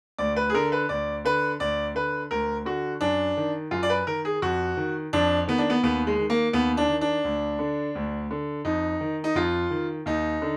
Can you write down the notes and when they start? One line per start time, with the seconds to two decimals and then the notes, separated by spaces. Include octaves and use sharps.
0.19 D2 D5
0.36 B4
0.50 G#4
0.54 D3 A#4
0.72 B4
0.89 D2 D5
1.25 D3 B4
1.60 D2 D5
1.95 D3 B4
2.31 D2 A#4
2.65 D3 F#4
3.01 F#2 D4
3.37 D#3
3.71 F#2 F4
3.83 D5
3.90 B4
4.07 D#3 A#4
4.25 G#4
4.42 F2 F#4
4.77 D#3
5.13 F2 D4
5.48 D#3 B3
5.58 D4
5.70 B3
5.83 D#2 B3
6.07 G#3
6.18 D#3
6.30 A#3
6.53 D#2 B3
6.77 D4
6.88 D#3
7.01 D4
7.25 D2
7.59 D3
7.95 D2
8.31 D3
8.65 F2 D#4
9.01 D#3
9.24 D#4
9.35 F2 F4
9.71 D#3
10.06 D#2 D#4
10.42 D3